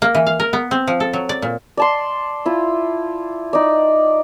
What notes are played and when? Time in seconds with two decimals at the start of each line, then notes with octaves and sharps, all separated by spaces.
0.02 A#3
0.15 E3
0.27 F5
0.40 A#4
0.53 B3
0.71 C4
0.87 F3
1.00 A4
1.13 F#3
1.29 D5
1.42 A#2
1.77 D5 A5 C6
2.46 E4 F4
3.53 D#4 D5